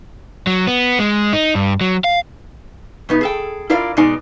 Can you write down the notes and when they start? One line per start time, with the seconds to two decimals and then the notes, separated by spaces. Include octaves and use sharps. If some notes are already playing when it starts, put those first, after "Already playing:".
0.47 F#3
0.67 B3
0.99 G#3
1.33 D#4
1.55 G2
1.81 F#3
2.04 F5
3.09 B2 B3 D#4
3.21 G#4 A4 G5
3.70 E4 F4 A#4 D5 F5
3.97 B2 G#3 D#4 D5 G#5